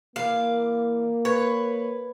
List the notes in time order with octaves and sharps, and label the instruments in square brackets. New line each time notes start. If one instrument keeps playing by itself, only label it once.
[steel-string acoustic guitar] E3 D5 [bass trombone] A#3 [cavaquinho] F5
[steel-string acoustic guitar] B4 [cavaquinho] C#5